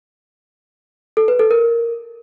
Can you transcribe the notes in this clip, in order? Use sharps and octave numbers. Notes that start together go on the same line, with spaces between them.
A4
B4
A4
A#4